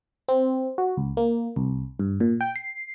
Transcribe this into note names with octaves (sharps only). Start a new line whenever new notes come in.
C4
F#4
C#2
A#3
C2
G2
A#2
G5
C7